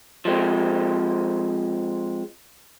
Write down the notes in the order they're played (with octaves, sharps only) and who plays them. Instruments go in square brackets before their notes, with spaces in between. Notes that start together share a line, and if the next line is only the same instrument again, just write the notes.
[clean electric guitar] F3 G#3 C4